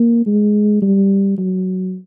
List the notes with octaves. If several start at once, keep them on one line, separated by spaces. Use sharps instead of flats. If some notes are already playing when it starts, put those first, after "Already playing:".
Already playing: A#3
G#3
G3
F#3